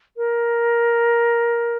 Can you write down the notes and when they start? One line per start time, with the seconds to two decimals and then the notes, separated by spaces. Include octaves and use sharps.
0.17 A#4